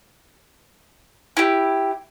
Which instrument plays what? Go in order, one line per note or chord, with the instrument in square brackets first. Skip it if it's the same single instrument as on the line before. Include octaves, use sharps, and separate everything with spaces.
[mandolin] E4 G4